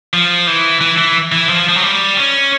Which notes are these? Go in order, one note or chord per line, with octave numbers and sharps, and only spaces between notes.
F3
E3
E3
E3
E3
F3
F3
F#3
G3
C#4